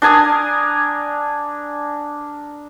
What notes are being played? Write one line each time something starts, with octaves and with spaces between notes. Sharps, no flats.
D4 A#4 G#5 D#6